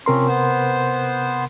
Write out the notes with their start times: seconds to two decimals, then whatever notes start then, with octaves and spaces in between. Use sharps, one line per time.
0.06 C3 F3 C4 C#4 A#4 C6
0.27 B3 C5